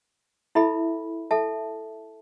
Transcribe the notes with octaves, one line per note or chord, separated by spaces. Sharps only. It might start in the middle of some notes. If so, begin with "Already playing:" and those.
E4 A4 E5 B5
A4 E5 A5